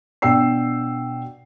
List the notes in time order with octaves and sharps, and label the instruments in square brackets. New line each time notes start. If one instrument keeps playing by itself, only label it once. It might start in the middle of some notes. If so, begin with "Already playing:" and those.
[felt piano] B2 D4 G5 E6 C7